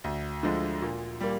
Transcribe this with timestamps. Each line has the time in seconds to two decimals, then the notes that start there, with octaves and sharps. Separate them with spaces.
0.04 D2
0.43 D3 F3 G#3
0.82 A#2
1.20 G3 A#3